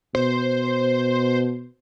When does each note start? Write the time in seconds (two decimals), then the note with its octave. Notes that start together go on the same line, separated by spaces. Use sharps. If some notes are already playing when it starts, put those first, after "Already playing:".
0.15 B2 C5